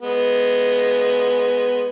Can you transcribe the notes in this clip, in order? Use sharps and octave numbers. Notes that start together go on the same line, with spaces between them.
G#3 B3